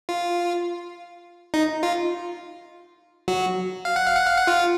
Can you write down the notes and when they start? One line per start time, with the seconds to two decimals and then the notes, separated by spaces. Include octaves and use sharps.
0.09 F4
1.54 D#4
1.83 F4
3.28 F#3 F#4
3.85 F5
3.96 F#5
4.06 F5
4.17 F#5
4.27 F5
4.38 F#5
4.47 F4 F5